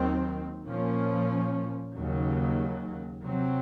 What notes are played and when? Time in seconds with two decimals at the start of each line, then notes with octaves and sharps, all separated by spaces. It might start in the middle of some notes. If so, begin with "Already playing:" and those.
Already playing: D#2 D#3 F#3 C4
0.66 A#2 F3 A#3 C#4
1.95 D#2 C#3 F#3
3.24 C3 F#3 C4